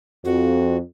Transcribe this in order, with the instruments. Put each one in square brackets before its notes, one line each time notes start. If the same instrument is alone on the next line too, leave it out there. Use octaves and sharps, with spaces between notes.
[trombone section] F2 [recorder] F#4